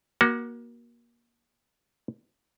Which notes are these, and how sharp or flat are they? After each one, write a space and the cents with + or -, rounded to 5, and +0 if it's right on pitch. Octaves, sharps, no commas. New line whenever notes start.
A#3 +25 F#4 +0